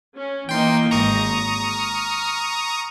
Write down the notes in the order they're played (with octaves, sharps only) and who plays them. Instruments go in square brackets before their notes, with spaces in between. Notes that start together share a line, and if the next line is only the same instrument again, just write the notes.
[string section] C#4
[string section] E3 A#3 D#4 [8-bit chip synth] G5 C6
[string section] G#1 A#6 [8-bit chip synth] A#5 C#6 D#6
[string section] F6